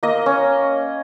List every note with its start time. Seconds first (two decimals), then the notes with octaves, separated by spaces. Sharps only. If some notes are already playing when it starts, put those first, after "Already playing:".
0.03 A#3 D#5
0.26 C#4